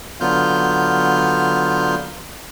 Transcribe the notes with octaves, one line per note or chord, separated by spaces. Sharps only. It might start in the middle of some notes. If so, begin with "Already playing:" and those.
D3 F#3 B3 F4 F6 G6